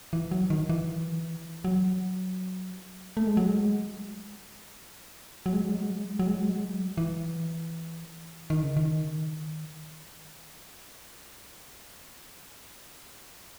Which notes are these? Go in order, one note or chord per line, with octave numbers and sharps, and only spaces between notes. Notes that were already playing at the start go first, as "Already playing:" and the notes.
E3
F#3
D#3
E3
F#3
A3
G#3
F#3
G#3
F#3
G#3
F#3
G#3
F#3
G#3
F#3
G#3
F#3
G#3
F#3
G#3
F#3
G#3
F#3
G#3
F#3
E3
D#3
C#3
D#3